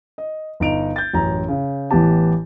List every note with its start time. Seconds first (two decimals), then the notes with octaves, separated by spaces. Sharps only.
0.18 D#5
0.60 G1 D#4 D7 F7
0.96 G6 A6
1.13 A1 F#2 A#5
1.48 C#3
1.91 A1 E3 B3 G4 A5